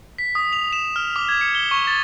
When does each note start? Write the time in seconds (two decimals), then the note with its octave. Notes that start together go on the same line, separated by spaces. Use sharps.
0.18 B6
0.35 D#6
0.53 F7
0.72 E7
0.96 F6
1.16 D6
1.29 G#6
1.41 C#7
1.55 G7
1.71 C#6
1.87 A6